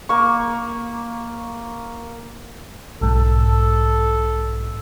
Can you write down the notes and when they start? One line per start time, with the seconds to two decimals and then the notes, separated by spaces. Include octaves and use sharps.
0.09 A#3 C#6
3.01 B1 G#2 A4